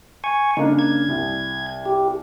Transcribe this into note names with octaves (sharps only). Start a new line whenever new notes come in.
G#5 C#6
C#3 A#3 D4 D#4
G#6
C2
G4